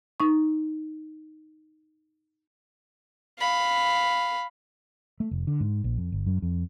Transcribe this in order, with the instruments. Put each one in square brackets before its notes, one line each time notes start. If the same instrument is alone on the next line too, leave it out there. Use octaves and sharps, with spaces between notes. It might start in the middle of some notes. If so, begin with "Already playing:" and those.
[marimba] D#4 C#6
[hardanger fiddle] F5 B5
[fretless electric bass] A3
F1
D3
G#2
A#1
F2
G1
F#2
F2